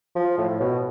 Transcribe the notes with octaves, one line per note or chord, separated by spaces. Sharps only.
F3
A2
B2